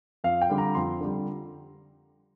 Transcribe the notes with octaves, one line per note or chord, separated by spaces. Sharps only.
F2 F5
G5
D3 G3
A#5
F2 C6
D3 G3